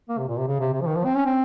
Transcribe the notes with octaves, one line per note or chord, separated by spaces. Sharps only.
A#3
C3
A#2
C3
C#3
C3
C3
F3
D#3
F3
C4
C#4
C4